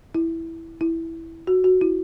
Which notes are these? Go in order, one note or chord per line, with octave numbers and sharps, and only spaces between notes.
E4
E4
F#4
F#4
E4